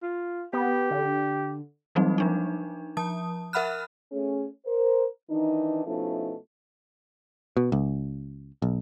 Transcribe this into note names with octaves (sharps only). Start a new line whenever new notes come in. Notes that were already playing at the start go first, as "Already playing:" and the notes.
F4
B3 G4
D3
E3 F#3 G3 A#3 C4 D#4
F3 D4 D#4
F3 A5 D#6
A#4 E5 F#5 B5 F6 F#6
A3 C#4 G#4
A#4 C5
D#3 E3 D4 D#4
B2 F3 A3 C#4 D#4 E4
B2
C#2
B1